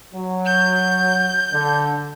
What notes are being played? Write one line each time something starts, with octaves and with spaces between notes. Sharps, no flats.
F#3
G6
D3